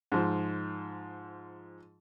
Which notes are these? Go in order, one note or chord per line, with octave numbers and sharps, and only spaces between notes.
G#2 F3